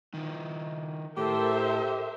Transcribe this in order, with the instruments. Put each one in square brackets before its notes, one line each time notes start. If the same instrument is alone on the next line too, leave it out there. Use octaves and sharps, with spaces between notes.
[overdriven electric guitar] D#3 F3
[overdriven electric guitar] A2 [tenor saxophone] G4 [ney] A4 [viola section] A#4 C5 E5